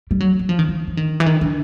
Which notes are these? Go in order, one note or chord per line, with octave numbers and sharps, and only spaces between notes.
G3
F#3
F#3
F3
D#3
E3
E3
D#3
E3
D#3
D3